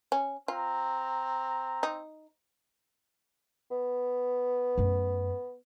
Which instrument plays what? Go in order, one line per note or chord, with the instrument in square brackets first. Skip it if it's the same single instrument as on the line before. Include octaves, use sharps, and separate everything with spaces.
[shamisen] C#4
[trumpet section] C4 A#5 [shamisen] F4
[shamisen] D#4
[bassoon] B3
[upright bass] F#2 A3